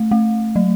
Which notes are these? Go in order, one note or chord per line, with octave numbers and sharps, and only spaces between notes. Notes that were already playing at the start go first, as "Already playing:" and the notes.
Already playing: A3
A3
F#3